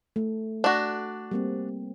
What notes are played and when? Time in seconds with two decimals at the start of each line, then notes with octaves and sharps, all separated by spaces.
0.16 A3
0.64 D4 F#4
1.31 G3 A#3 C4